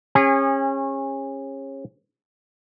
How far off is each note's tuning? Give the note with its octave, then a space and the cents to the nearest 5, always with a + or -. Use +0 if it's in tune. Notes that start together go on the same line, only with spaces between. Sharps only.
C#4 -25 G#4 -35